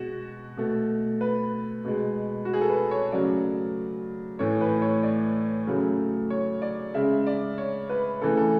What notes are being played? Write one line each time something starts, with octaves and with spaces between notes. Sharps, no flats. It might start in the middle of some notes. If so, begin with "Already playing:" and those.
Already playing: B2 G#3 F#4
B2 A3
B4
B2 G#3
F#4
G#4
A4
B4
C#5
C#3 F#3 A3 D5
A2 E3 A3 C#5
B4
C#5
D5
C#3 F#3 A3
C#5
D5
C#3 G#3 E5
D5
C#5
B4
C#3 E3 A3 A4
A4